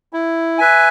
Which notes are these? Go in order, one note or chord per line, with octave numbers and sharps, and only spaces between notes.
E4
B4 E5 G#5